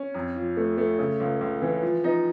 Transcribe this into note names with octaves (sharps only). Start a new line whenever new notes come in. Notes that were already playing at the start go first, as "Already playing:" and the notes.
Already playing: C#4
F2
F3
A3
A3
C#3
C#2
C#2
E3
F3
F3 D#4